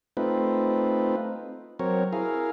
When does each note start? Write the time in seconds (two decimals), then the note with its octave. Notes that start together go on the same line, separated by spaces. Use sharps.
0.17 A3 C4 D#4 F4 B4
1.79 F#3 C4 A#4 C#5
2.13 E4 G#4 A#4 F5